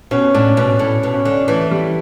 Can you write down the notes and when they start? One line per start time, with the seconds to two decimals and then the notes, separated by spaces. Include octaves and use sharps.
0.11 B2 C#4
0.34 A2 D4
0.57 B2 C#4
0.79 A2
1.03 B2
1.14 C#4
1.25 D3
1.48 E3 A3
1.71 G3